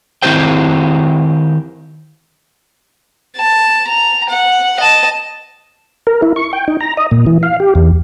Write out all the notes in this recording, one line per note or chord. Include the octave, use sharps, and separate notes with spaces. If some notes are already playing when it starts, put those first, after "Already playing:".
D#3 C4 E4 G4 C5 G5
A5
A#5
F#5
D#5 A5
A#4
E4
C#6
G5
D#4
A#5
D#5
A#2
E3
F5
G4
E2